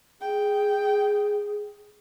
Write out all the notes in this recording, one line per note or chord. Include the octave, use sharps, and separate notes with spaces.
G#4 G5